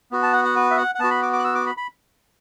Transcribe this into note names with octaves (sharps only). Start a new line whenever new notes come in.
B3 F#4
A5
F#5
F#5
B4
E5
F#5
F#5
B3 F#4 A5
B5
D6
D6
F#6
E6
D6
B5
B5